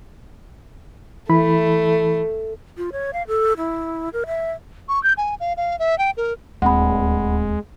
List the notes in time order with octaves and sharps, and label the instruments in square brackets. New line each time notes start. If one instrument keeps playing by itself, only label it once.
[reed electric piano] E3 E4 B5 [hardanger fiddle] A3
[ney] F4
C#5
F5
A4
E4
A#4
E5
[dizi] C#6
G6
G#5
F5
F5
E5
G5
A#4
[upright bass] D1 [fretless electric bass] D#2 C4 [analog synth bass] G#3 [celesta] F#5 B5